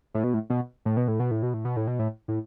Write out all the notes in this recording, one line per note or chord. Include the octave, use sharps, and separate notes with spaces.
A2
B2
A2
B2
A2
B2
A2
B2
A2
B2
A2
B2
A2
B2
A2
A2